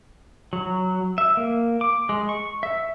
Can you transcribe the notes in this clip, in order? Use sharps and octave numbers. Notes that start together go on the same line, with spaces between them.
F#3
E5
A#3
D6
G#3
C#6
E5